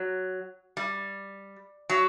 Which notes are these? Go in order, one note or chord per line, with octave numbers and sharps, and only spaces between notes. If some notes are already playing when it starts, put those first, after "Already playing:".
Already playing: F#3
G3
F#3